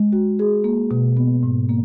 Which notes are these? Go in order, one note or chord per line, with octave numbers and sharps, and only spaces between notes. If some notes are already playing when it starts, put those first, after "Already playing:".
Already playing: G#3
F#4
G#4
A#3
B2
B3
G#2
A#3